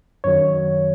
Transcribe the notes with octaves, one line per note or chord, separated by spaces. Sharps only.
F#2 D#3 F#3 C#5